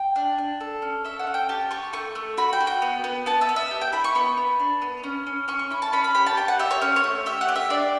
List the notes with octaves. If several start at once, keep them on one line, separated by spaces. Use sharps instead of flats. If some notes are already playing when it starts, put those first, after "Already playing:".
Already playing: G5
D4
D4
A4
C#4
A4 E5
F#5
C#4
G5
G4 A5
G4 C#6
A3 C#6
A3
F#4 B5
G5
F#4
G5
B3
B3
B3 A5
E5
B3
E5
G4
G5
E4 B5
C#6
B3 B5
B3
D4
B3
C#4
C#4
C#4 C#6
C#6
E4 B5
A5
C#4 B5
B5
G4 B5
A5
G4 G5
F#5
G4 E5
C#5
C#4 C#5
C#5
A3
G4 E5
F#5
G4
E5
D4 D5